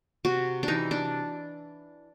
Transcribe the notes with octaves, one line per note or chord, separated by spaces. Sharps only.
C3 F#4
D4
E3 D#4
D4